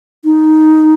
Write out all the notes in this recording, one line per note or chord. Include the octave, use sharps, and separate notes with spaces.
D#4